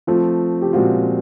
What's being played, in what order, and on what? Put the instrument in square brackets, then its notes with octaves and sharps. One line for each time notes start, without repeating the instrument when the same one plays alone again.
[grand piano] F3 A3 C4 [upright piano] F4
[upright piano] G4
[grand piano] A#2 F3 G#3 C4 F4 [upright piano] F#4